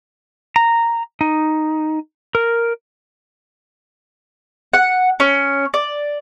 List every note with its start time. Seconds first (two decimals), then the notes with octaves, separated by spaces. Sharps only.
0.56 A#5
1.21 D#4
2.35 A#4
4.73 F#5
5.20 C#4
5.74 D5